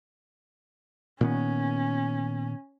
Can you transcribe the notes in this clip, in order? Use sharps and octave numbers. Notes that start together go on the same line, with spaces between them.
A#2 D#3 B3 C#4